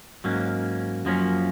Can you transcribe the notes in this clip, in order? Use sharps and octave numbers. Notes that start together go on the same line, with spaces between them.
G#2 F#3 A#3 C#4
F#2 F3 A#3 C#4